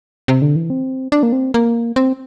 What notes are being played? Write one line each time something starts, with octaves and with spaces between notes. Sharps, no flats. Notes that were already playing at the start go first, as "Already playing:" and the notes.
C3
D3
E3
C4
D4
A#3
C4
A#3
C4